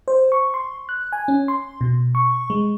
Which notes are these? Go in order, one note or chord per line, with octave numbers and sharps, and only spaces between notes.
C5
C#6
C6
F#6
G#5
C#4
C6
B2
C#6
G#3